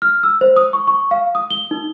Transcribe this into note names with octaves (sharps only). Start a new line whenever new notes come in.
F6
E6
C5
D#6
C#6
C#6
F5
D#6
G7
D#4